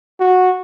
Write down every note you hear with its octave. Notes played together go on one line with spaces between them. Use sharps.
F#4